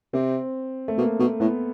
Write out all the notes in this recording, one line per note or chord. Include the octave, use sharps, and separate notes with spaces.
C3 C4
A3
B2 A#3
B2
A2 B3